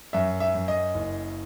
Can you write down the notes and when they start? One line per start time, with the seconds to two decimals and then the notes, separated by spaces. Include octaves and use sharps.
0.13 F#2 E5
0.40 E5
0.55 F#2
0.68 D#5
0.95 F#1